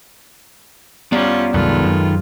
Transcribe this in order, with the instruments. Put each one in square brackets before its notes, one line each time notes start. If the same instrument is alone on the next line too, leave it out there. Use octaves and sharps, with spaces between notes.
[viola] G3 C#4 [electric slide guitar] B3 D5 [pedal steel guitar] F4
[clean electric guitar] C2 F#2 [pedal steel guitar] D#3 A4 B4 [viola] G#3 F4
[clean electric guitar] F#2